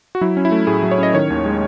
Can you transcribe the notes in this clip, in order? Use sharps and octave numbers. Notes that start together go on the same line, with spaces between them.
F#4
F#3 E4
C#4
E4
A3
A2 G#4
F#3
C#5
C#4 D#5
D#3 C#5
D#2
G#3